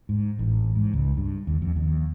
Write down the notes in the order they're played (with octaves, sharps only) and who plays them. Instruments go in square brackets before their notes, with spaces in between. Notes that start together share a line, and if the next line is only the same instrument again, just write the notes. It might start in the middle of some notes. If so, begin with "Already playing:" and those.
[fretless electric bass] G#2
A1
G#2
C#2
G2
D#2
F2
D#2